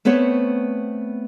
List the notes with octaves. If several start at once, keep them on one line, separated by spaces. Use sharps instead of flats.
A3 B3 C4 B4 C#5